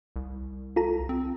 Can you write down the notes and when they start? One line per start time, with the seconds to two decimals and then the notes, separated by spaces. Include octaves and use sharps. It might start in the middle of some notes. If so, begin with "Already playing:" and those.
0.16 C2
0.76 F4 A4 A#5
1.09 C4